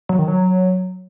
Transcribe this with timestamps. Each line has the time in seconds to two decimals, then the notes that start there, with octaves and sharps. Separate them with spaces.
0.09 F#3
0.19 D#3
0.28 F#3